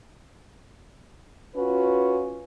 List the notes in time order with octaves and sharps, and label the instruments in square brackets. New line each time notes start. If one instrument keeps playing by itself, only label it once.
[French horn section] C#4 F4 F#4 B4